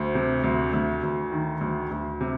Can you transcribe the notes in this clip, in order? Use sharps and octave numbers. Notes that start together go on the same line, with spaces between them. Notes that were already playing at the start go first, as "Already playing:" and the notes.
Already playing: D2 C5
C3
D2
D2
D2
D#3
D2
D2
C3